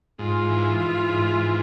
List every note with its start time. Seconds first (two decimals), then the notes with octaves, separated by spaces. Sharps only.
0.19 G#2 F4
0.50 E3
0.80 E3
1.09 G#2
1.40 E3